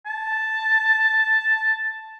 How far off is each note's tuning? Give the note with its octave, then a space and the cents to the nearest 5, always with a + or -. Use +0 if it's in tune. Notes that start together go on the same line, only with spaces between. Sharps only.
A5 +0